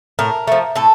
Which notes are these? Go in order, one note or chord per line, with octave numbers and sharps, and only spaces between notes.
A2 A#4
F3 A3
A2 A4